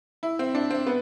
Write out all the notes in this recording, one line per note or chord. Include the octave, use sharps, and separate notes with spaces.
E4
C4
D4
C4
B3